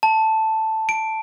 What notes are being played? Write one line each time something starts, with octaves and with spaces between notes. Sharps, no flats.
A5
D7